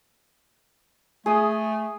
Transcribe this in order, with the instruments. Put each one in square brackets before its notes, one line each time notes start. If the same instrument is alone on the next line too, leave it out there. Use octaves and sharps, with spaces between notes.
[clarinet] A3 [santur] G#4 D#6